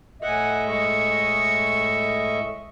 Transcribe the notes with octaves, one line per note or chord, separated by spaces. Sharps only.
A2 D#5 E5 F#5 G#5
G#3 C#6